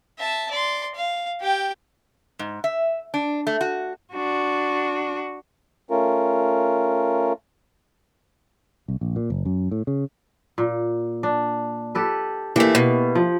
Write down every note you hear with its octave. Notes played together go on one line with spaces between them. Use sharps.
E5 A5
D5 C6
F5
G4 G5
G#2
E5
D4
A3
F#4
D4 F#4
A3 C#4 F4 A#4
C2
A#1
A#2
F#1
F#2
A2
C#3
A#2
D4
G4 A4 B4
E3 A3 A#3 E4 G4
B2
F3